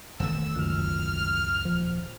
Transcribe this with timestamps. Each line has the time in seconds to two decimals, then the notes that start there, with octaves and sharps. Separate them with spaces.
0.20 E1 D#3 A3 E6
0.56 C#2 F#2 F6
1.65 D#1 F3